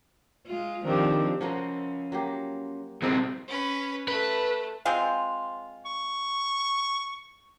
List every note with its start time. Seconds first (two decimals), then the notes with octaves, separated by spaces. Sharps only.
0.46 G#3 F4
0.85 D#3 F3 C4 D4 G4
1.41 F3 C#4 F4 F#4 A#4
2.12 F#3 A#3 G4
3.02 B1 A#2 G#3 C4 G#4
3.48 C#4 B4
4.08 A3 B4
4.85 G#3 C4 F4
5.85 C#6